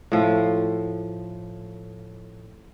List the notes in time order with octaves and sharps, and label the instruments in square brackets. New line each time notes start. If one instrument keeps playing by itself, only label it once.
[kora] A2 F3